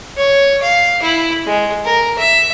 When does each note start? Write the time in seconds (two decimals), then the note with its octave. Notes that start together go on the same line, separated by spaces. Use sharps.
0.17 C#5
0.62 F5
1.02 E4
1.46 G#3
1.85 A#4
2.18 E5